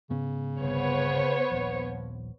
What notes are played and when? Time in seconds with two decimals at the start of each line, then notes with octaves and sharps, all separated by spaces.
0.10 G#2 C#3 B3 C#4
0.60 G1 C2 B3 C5 C#5
1.51 D#1 A#1 F3